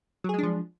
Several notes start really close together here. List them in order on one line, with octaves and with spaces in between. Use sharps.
F#3 G#4 G#3 D4 F3